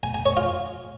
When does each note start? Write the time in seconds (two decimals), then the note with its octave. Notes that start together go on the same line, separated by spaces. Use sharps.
0.03 G#5
0.14 G#5
0.26 C#5
0.37 F4